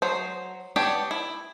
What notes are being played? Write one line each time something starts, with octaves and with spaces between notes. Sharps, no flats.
F#3 C5
B3 D4 G4 C#5
E4